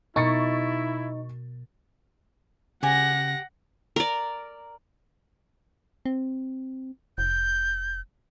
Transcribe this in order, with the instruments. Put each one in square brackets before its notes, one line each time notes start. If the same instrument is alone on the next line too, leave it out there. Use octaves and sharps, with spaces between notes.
[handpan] B2 A#4 [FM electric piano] D#4 [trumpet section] E4 [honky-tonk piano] C#6 A6 C#7
[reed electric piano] C#3 [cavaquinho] G4 G#5 [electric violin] F#5 A#6
[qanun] A#4 D5
[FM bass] C4
[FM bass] F1 [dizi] G6